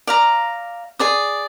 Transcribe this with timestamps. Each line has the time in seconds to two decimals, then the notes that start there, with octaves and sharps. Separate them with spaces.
0.07 D5 F5 A#5
0.99 G#4 D5 D#6